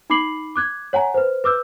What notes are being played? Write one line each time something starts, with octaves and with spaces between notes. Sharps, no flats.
D#4 B5 D6 C7 F#7
D6 F#6 G#6
C#5 F#5 G#5 A#5
B4 C5
B4 D6 E6 G6